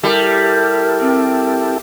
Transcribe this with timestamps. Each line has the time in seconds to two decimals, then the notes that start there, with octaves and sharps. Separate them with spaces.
0.03 G3 E4 G4 A4 A#4
1.00 C4